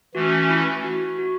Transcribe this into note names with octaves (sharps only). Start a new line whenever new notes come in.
E3 A3 C#4 F#4
E4
F#4
F#4